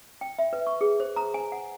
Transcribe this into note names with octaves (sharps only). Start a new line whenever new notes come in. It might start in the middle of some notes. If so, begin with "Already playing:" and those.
G5
E5
B4
C#6
G#4
C5
A#5
G#5
F#5